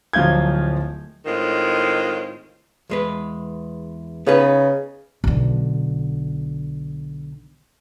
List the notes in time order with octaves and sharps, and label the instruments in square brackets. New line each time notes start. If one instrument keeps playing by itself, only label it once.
[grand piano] D1 F3 F#3 F4 G6 G#6
[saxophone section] A2 D#3 G#3 C4 F4
[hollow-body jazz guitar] E2 G#3 B4
[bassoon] C#3 [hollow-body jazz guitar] B3 D#4 B4
[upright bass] B1 D3